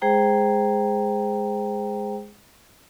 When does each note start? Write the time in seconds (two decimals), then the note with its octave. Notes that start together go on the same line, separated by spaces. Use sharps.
0.01 G#3 G#4 C5 G5 A#5